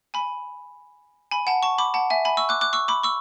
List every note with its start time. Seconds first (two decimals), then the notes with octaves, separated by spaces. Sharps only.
0.14 G#5 B5
1.31 G#5 B5
1.47 F#5 A5
1.63 A5 C#6
1.78 B5 D6
1.94 F#5 A5
2.10 E5 G#5
2.25 G#5 B5
2.37 C#6 E6
2.49 D6 F#6
2.61 D6 F#6
2.73 C#6 E6
2.88 B5 D6
3.03 C#6 E6